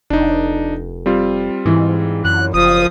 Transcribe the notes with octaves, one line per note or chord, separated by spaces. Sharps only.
F1 D4 D#4
G3 C4 F4
G#2 E3
F#2 F#6
F#1 F3 D#6